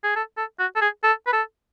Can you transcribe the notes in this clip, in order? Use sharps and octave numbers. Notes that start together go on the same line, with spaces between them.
G#4
A4
A4
F#4
A4
G#4
A4
B4
A4